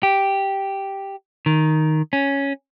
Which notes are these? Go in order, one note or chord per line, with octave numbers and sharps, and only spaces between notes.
G4
D#3
C#4